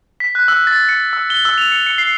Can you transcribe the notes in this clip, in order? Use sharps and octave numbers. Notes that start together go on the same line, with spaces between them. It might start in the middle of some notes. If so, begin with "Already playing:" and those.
B6
F#6
E6
A6
C#7
E6
G7
E6
F7
C#7
C#7
C7